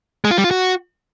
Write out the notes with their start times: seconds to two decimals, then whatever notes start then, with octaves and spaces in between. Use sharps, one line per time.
0.24 G#3
0.31 F4
0.38 G3
0.44 F4
0.51 F#4